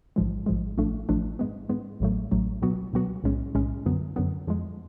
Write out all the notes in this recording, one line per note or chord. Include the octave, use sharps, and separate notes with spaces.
A1 G#2 F3 G#3
A1 G#2 F3 G#3
A1 A2 F3 A3 D4
A1 A2 F3 A3 D4
G#2 G#3 B3
G#2 G#3 B3
A1 A2 F#3 A3
A1 A2 F#3 A3
C#2 B2 F#3 B3 F#4
C#2 B2 F#3 B3 F#4
B1 A2 G#3 C#4
B1 A2 G#3 C#4
F#2 D3 F#3 B3
F#2 D3 F#3 B3
F2 F3 G#3